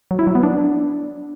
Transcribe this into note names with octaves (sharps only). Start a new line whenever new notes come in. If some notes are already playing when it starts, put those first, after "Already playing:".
F#3
E4
F#3
B3
D4